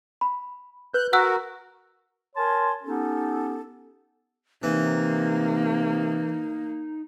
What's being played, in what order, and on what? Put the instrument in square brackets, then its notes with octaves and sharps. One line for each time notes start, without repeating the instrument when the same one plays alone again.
[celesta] B5
[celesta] B4 [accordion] F#6 G6
[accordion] F#4 A#4 [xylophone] F#5 E6 F#6
[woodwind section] A#4 C#5 G#5 A5 C6
B3 C#4 D#4 G4 A4
[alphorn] C3 [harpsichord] E3 [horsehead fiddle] A#3 [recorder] D#4